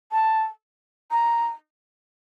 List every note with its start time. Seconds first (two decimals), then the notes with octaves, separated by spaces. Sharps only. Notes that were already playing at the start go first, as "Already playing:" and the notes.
0.12 A5
1.11 A#5